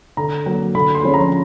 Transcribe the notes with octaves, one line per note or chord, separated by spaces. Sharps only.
D3 A#5
F#3 A#3
D3 B5
C6
F3 G#3 C#4 F4
A#5